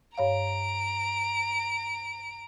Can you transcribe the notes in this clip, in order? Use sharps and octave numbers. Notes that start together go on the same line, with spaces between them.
G2 C#5 F5 A#5 D7